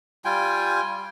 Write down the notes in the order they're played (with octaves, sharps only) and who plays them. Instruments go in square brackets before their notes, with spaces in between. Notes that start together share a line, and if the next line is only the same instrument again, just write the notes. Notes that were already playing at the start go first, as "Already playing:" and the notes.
[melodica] G3 F4 G5 G#5